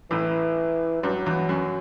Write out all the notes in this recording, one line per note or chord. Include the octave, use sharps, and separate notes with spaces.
A1 A2 E3
G2 F#3
E2
F#2